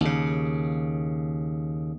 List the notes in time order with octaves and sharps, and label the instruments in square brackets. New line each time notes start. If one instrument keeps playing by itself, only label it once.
[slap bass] D#2 C#3